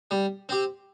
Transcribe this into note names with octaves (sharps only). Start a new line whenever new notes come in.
G3
C4 G4